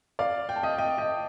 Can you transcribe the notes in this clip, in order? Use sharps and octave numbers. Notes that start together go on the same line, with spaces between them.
D5 F5
G5
A5
D#5 G5
D#5 G5
D#5 G5